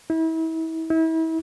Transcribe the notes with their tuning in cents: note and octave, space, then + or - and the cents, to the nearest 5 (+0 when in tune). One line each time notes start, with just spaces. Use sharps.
E4 -35
E4 -35